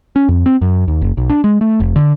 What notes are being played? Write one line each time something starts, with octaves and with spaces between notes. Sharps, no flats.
C#4
F2
C4
F#2
D#2
F#1
B1
D4
G#3
A3
F1
D3